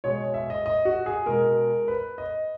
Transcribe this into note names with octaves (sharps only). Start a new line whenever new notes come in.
B2 G#3 C#5
E5
D#5
D#5
F#4
G#4
B2 G#3 A#4
B4
D#5